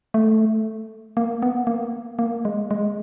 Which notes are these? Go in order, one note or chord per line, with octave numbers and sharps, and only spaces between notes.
A3
A#3
B3
A#3
A#3
G#3
G#3